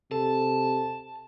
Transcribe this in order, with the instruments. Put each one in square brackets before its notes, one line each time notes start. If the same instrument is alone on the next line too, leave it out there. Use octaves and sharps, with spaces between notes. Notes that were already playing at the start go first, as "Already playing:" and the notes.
[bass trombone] C3 [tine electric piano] A4 [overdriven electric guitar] A5